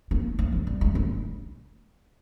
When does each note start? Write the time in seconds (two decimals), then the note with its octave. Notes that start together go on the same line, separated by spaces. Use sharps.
0.11 A#3
0.39 A#3
0.52 E3
0.67 G3
0.81 G#3
0.95 A#3